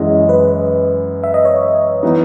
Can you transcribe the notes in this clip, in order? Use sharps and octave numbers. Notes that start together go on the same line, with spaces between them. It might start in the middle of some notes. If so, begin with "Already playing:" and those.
Already playing: F#2 E3 G#3 D#5
B4
E5
D#5
C#5
E3 B3 D#4